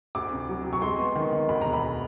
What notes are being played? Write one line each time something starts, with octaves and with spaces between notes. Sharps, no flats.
D2 D6
C3
F#3
C3
C#6
G#3 C6
B3
D#3
D#3
D2 B5
E1 A#5
B5